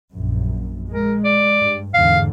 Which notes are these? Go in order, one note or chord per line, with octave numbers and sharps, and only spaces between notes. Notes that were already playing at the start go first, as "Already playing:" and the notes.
A#1 F#2
G#3 A#4
D5
G2
E2 G#2 D3 F5